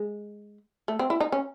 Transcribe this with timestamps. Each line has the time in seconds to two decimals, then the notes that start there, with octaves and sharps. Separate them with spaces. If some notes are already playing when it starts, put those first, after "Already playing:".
Already playing: G#3
0.88 A3
0.99 C4
1.10 E4
1.20 D#4
1.32 C#4